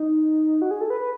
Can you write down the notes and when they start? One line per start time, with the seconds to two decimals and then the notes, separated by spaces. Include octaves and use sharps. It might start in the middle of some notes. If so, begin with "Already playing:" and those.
Already playing: D#4
0.62 F#4
0.71 G#4
0.81 A4
0.90 B4
1.00 B4